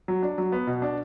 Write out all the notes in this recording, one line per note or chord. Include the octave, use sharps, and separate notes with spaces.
F#3
D4
F#3
B3
B2
D4